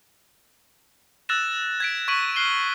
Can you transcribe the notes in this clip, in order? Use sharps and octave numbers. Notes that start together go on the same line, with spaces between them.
E6 F#6 A6 A#6 E7
G#6 B6 D7
C#6 G#6 B6 D7 D#7 F#7
F6 F#6 C7 G7